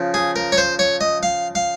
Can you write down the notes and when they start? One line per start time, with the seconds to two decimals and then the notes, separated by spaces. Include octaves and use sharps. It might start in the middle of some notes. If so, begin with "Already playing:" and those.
Already playing: C#3 F3
0.14 G#4
0.36 A#4
0.52 C#5
0.58 C5
0.79 C#5
1.01 D#5
1.23 F5
1.55 F5